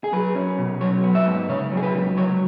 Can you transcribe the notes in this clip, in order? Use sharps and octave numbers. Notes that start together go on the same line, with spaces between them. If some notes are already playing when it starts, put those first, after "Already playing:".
G#4
F#3 B4
C#4
B2
F#3 C#5
B3
E5
G#2
C#3 C#5
F#3
G#4
B4
C#2
F#3 C#5